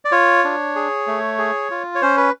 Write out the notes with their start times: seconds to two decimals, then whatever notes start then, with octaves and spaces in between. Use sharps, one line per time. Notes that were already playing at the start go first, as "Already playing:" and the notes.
0.05 D5
0.12 F4 C#5
0.44 D4
0.76 G#4
1.07 A3
1.38 G#4
1.71 F4
1.95 C#5
2.02 C#4 C5
2.18 B4